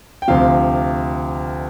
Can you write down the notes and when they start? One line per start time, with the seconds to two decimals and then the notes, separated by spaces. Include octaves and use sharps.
0.22 G5
0.28 D2 C3 F3 F5